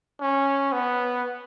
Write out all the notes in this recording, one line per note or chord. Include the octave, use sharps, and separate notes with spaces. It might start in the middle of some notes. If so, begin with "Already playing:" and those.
C#4
B3